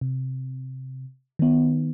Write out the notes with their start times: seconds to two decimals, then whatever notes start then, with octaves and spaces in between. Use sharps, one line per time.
0.01 C3
1.39 D#3 B3